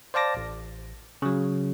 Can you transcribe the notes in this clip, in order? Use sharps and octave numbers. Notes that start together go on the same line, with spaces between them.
C5 D5 F5 A5 D6 A#6
A1
C#3 F#3